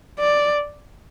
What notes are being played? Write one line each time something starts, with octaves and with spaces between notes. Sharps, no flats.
D5